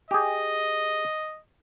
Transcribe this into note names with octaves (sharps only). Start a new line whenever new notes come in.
G4 G#4 D#5